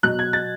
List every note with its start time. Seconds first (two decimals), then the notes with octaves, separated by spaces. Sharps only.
0.03 B2 F#3 F#6
0.19 G#6
0.33 A6